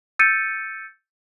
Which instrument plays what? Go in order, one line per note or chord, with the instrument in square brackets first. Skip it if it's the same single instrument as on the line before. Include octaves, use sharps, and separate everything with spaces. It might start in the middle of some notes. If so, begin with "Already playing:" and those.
[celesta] E6 G6 A6 C#7 D#7